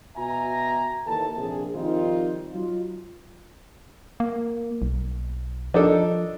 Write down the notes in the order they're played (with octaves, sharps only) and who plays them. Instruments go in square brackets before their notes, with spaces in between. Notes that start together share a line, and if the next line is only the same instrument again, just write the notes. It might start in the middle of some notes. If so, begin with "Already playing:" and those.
[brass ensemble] B2 F#4 E5 G#5 A#5
D#2 E3 A4 A5
A#1 C3 G#4
D#3 F3 G3 C4 D#4 F4
F#3 D#4 F4
[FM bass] A#3
B1
[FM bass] F3 [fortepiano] D4 D#4 A4